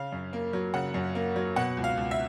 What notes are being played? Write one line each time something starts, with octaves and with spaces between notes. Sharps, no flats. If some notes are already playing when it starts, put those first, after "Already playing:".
Already playing: C#3 F5
F#2
A#3
F#3
C#3 F#5
F#2
A#3
F#3
B2 F#5
C#2
F5
C#2
E5